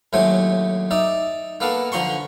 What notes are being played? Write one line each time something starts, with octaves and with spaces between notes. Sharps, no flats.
D#2 A2 F#3 A3 C5 G#5
D#4 D5 E5
A#3 B3 A4 F5 A5
D3 F3 A#5 C6 C#6